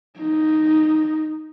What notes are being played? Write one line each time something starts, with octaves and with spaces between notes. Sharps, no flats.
D#4